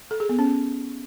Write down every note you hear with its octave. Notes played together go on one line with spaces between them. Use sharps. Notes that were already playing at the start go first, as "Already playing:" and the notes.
A4
G#4
B3
C#4